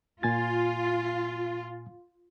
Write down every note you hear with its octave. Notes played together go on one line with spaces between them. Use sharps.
A#2 F4 G#5 A6